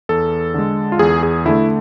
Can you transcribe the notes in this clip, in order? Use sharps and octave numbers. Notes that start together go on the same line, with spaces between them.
E2 A4
D3 G#3
F4
E2 G#4
G#4
D3 A3 E4